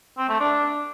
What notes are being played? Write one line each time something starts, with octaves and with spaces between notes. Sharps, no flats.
C4
A3
D4